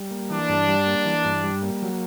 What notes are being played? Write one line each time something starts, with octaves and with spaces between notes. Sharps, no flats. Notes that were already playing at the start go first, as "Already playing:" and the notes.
Already playing: G3
A#3
E3 D4
G2
G3
A#3
E3
G2
G3
A#3
F#3